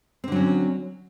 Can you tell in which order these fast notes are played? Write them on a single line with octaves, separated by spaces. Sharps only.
C4 D3 F#3 C#4